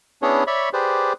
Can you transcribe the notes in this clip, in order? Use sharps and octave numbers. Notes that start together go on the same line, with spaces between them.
B3 C#4 D4 E4 G#4 C#5
C#5 D5 E5 B5 C#6
G4 G#4 B4 C5 D5